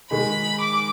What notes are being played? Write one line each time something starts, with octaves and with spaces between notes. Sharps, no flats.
D#3 G#3 D#4 G#4 B5
D6